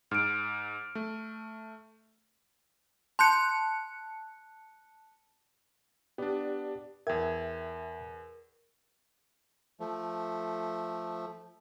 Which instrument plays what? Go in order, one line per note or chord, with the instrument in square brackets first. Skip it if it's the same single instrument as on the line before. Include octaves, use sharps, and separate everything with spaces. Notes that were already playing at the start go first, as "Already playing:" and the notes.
[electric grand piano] G#2 [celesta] F6 D7
[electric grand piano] A3
[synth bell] A5 F#6 C#7 [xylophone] C6 G6
[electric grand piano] B3 D4 [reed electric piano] G4 D5
[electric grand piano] E2 G#6 [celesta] A#4 [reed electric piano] E5 G5
[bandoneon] F3 A3